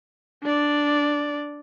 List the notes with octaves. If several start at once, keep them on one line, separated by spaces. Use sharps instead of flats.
D4 D5